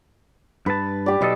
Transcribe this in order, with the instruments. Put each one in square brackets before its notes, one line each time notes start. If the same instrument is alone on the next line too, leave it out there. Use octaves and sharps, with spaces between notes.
[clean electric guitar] G2 A5 [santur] B4
[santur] G4 D5
[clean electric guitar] B1 B2 A4 [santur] B4 D#5